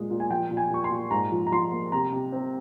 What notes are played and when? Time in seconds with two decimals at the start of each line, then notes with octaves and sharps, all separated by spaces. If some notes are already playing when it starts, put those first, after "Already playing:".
Already playing: A#2 G#3
0.11 A#2
0.20 G#5
0.31 F3 G5
0.51 A#2
0.57 G#5
0.70 A#2 C#6
0.84 C6
0.91 A#2
1.11 G#2 A#5
1.32 F3
1.47 A#5
1.52 F3 C6
1.72 A#3
1.92 C3 A#5
2.12 C3
2.32 C4